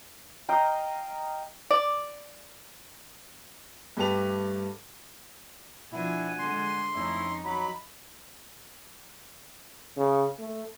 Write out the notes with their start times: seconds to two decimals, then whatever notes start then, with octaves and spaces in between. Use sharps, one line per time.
0.49 D#5 F5 G5 A#5
1.71 D5
3.97 G2 A3 G4 B4 A5 F7
5.93 B2 F3 D4 E4 F#5 G#5
6.39 D3 G#3 C6
6.93 F2 A3 C#4 D#4 E4
7.44 F#3 D#5 A#5 B5
9.97 C#3
10.39 A3